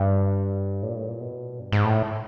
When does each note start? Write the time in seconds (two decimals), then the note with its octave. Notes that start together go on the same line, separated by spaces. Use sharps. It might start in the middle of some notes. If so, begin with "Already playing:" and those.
Already playing: G2
0.83 A2
0.89 A#2
0.96 A2
1.08 A#2
1.21 B2
1.60 G2
1.72 G#2
1.85 A2